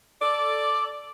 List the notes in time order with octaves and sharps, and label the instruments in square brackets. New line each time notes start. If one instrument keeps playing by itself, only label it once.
[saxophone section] A4 D5